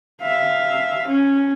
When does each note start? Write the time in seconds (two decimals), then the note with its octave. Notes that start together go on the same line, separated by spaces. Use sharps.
0.22 E5 F5
1.07 C#4